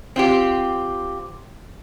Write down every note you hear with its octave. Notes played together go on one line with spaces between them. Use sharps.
C4 F4 G4